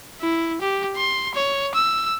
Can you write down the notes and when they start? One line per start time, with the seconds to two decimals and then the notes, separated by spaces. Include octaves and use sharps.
0.21 E4
0.61 G4
0.97 C6
1.35 C#5
1.75 E6